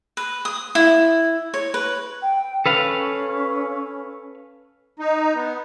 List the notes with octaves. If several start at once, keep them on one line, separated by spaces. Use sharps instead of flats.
B4
D#6
E4
C#5
B4
G5
C#4 A4 B4 F5
D#4
B3